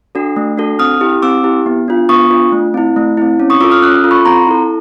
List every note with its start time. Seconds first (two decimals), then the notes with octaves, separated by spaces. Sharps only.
0.15 D4 F#4 A4
0.36 A3
0.58 D4 F#4 A4
0.79 C4 D#6 F6
1.01 E4 G4
1.22 C4 D6 E6
1.44 E4 G4
1.66 B3
1.88 D4 F4
2.09 B3 C#6 D#6
2.31 D4 F4
2.52 A3
2.74 C4 E4
2.96 A3
3.17 C4 E4
3.40 C#4
3.50 C#6 D#6
3.61 F4 D6 E6
3.64 A4
3.71 D#6 F6
3.82 C#4 E6 F#6
4.04 F4 A4
4.11 B5 C#6
4.25 C4 A#5 C6
4.47 E4 A4